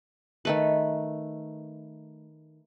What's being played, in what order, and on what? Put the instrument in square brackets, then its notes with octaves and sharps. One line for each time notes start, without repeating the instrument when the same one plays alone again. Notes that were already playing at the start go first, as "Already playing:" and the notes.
[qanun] D#3 A3 B4